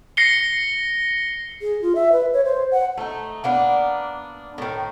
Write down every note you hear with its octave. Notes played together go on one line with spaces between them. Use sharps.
A#6 C7 C#7 G7
G#4
F4
E5
B4
C#5
C5
F#5
A3 D#4
A#3 B3 D4
A2 D#3